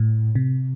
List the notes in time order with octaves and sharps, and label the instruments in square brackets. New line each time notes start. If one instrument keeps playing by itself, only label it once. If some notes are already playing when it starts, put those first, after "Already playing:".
Already playing: [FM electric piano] A2
C3